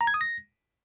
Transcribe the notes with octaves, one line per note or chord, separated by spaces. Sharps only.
A#5
G#6
D#6
A#6